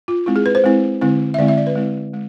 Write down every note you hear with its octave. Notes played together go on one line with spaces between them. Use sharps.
F4
G#3 C4 E4
G#4
B4
C5
G#3 C4 E4
D3 G#3 C4 E4
E5
D3 G#3 C4 E4 D5
E5
D5
B4
G#3 C4 E4
G#3